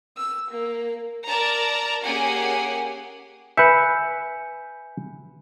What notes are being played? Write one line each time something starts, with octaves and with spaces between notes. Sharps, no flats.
E6
A#3
A#4 D5 A5 A#5
A#3 C#4 G4 G#4 F#5 G#5
B4 E5 G#5 G6 C#7